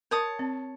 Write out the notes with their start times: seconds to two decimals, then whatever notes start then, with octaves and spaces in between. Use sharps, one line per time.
0.11 A#4 C#5 A5 D#6
0.39 C4